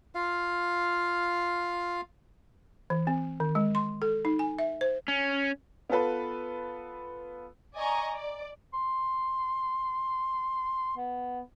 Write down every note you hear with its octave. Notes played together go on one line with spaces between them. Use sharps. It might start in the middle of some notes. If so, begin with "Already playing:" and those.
F4 F5
E3
C4
D#3
G#3
C6
A4
D#4
G#5
E5
C5
C#4
B3 F4 A4 B4
D5 D#5 G#5 A#5 C#6
D5
C6
B3